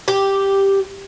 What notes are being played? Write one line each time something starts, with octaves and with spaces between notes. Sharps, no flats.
G4